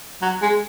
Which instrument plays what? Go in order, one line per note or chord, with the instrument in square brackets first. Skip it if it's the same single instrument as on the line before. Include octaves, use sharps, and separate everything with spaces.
[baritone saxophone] F#3
G#3